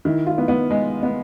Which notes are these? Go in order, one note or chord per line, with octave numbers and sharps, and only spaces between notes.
D#3 E4
F4
B3
B3
G#3
B3